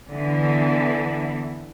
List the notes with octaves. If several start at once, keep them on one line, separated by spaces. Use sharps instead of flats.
D3 E3 B3